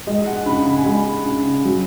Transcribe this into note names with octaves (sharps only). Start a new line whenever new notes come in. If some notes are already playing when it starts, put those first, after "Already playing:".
G#3 D#5
F#5
C#3 B5
B5
G#5
G#3 B5
C#3
F#3